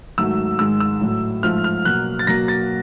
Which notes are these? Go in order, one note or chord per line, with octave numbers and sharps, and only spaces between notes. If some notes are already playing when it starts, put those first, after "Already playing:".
G#2 D#3 F#3 A3 E6
G#2 D#3 G#3 E6
E6
A2 F#3 A3
G#2 F3 A3 F6
F6
B2 F#3 A#3 F#6
A6
B2 F#3 A#3 A#6
A6